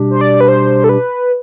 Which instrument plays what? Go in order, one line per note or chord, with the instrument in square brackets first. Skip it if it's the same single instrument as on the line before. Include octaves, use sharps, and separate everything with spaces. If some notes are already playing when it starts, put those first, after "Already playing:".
Already playing: [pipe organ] B2 G3 D4 G4
[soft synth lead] C5
D5
B4
C5
A4
B4